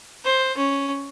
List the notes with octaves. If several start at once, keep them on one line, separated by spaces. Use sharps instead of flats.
C5
C#4